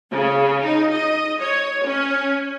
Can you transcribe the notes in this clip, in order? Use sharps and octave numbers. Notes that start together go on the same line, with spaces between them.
C#3
D#4
D#5
C#5
C#4